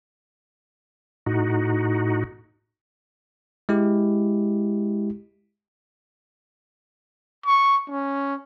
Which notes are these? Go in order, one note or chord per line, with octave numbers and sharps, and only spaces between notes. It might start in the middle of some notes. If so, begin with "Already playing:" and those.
A2 D#4 F#4
G#3 E4 G4
C#6
C#4